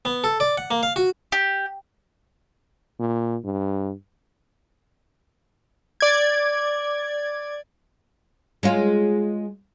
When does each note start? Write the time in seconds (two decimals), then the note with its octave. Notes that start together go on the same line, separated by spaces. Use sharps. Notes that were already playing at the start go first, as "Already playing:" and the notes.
0.05 B3
0.24 A4
0.40 D5
0.58 F#5
0.71 A#3
0.83 F5
0.96 F#4
1.32 G4
3.00 A#2
3.44 G2
6.00 D5 G#6
8.63 G#3 C#4 F4